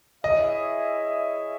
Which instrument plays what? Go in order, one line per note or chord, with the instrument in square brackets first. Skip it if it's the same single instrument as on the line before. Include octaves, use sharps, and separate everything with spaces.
[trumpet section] E4 G#4 C#5 E5 [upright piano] D#5